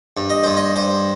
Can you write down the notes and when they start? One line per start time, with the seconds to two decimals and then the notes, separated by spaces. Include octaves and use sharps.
0.17 G2
0.30 D#5
0.43 G2 C5
0.57 D#5
0.76 G2 C5